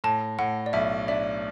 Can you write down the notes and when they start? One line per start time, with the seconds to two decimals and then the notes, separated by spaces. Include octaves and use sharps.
0.04 A2 A5
0.39 A2 F#5
0.66 D5
0.73 B1 E5
1.08 D4 E5